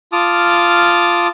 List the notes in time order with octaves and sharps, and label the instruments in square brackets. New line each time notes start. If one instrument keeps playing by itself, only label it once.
[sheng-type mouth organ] F4 A5 D6 D#6 F6